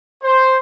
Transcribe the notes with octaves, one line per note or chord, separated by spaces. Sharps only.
C5